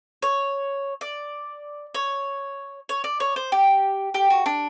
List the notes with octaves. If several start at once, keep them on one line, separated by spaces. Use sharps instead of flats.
C#5
D5
C#5
C#5
D5
C#5
C5
G4
G4
F#4
D4